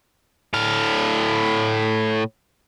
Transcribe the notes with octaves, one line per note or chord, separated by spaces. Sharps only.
A2 F5